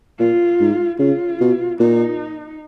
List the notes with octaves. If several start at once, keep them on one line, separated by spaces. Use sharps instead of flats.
A#2 F4
G#2
C#3 F4
B2
A#2 D#4